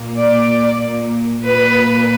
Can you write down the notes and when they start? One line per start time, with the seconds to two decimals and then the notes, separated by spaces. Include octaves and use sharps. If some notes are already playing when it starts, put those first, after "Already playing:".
Already playing: A#2 A#3
0.18 D5
1.44 A#2 A#3 B4